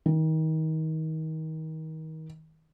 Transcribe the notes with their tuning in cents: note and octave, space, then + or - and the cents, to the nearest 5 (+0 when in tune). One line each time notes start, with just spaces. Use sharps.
D#3 +30